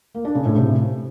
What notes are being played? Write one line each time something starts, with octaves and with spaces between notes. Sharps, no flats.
A#3
D4
C#3
A2
C3